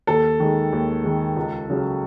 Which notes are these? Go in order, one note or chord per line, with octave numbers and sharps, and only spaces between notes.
D#2 A4
D#3 G#3
D#2
D#3 G#3
C#2
C#3 F#3 C#4